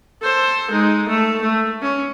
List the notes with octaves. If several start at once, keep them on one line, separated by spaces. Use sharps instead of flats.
A4 C5
G#3 D#4
A3 A4
A3
C#4